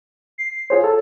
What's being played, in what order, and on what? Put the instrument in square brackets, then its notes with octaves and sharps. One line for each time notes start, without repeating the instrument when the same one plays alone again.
[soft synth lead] C7
[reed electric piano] F4 G#4 C5 [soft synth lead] C#5
[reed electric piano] A4 A5